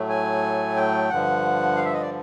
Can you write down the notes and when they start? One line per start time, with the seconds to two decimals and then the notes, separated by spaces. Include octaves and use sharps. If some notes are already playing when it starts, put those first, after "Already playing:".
Already playing: A2 F#3 A3
0.09 G#5
0.76 G5
1.10 G2 D3 F3 F#5
1.76 F5
1.85 E5
1.93 D#5
2.02 D5